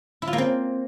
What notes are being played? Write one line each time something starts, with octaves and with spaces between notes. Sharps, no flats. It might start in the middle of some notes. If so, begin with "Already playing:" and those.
E4
F4
A#3
C4